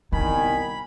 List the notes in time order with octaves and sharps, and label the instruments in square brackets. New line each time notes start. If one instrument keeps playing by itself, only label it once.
[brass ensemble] C2 A#2 G#5 [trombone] D#3 [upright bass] B3 [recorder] B5